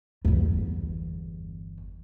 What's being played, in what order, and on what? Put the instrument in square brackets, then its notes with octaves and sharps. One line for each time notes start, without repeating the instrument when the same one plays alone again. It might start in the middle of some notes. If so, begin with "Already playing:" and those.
[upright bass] G1 E2